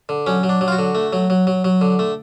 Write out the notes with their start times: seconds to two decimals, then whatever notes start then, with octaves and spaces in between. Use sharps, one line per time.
0.09 D3
0.27 F#3 C#4
0.43 F#3
0.49 D4
0.61 F#3
0.68 F4
0.72 F#4
0.79 D3
0.95 A3
1.13 F#3
1.30 F#3
1.47 F#3
1.64 F#3
1.81 D3
1.99 A3